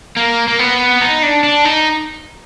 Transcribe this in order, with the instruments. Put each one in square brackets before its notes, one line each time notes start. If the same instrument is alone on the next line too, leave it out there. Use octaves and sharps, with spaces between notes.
[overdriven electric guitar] A#3
A#3
B3
D#4
D4
D4
D#4